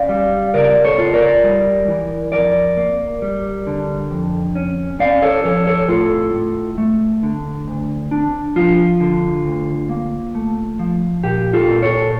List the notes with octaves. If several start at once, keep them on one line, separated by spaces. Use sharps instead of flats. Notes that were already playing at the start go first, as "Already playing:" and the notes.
Already playing: C#4 D5 F5
G3
C#3 A#4 D5
A4 C#5
F4
A#4 D5
G3
E3
F2 A#4 D5
A#3
G3
D3
F2
C#4
C#4 D5 F5
A4 C#5
F3 A4 C#5
A4 C#5
A2 F4 A4
A2
A3
D3
D2
D4
F3 F4
D3
D2
A#3
A3
F3
A#2 G4
F4 A4
A#2
A4 C#5